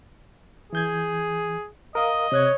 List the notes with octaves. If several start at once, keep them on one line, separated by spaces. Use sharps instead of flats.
E3 G#4 G6 G#6
A#4 D#5 F5 D#6
C3 C#5 F#6 G#6